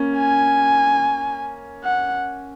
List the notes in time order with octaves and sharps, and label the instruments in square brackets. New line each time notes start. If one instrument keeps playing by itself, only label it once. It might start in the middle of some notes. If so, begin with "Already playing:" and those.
Already playing: [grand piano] A#3 C#4
[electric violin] G#5
F#5